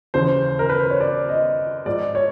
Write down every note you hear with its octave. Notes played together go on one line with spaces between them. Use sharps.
D#2 C#3 E3 C5
A#4
B4
C5
C#5
D5
D#5
G#2 F3 D5
C#5